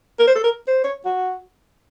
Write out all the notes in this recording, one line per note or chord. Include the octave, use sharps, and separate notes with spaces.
A#4
C5
A4
A#4
C5
C#5
F#4